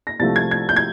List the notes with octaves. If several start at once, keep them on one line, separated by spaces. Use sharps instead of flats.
A#6
C2 C3 F3 A3 A6
G#6
G#6
G6
G#6